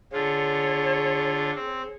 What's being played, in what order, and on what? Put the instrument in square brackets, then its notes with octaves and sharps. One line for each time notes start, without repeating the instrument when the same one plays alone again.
[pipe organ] D3 F4 [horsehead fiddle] G#4 C#5
[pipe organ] C4